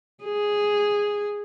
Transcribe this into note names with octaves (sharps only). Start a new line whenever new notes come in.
G#4